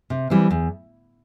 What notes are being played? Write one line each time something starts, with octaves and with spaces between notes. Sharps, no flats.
C3
E3 G3 C4
E2